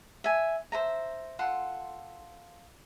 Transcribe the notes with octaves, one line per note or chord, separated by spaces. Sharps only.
E5 G#5
C5 E5 A#5
F4 A4 F#5 C6